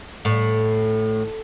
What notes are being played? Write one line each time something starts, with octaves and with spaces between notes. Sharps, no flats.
A2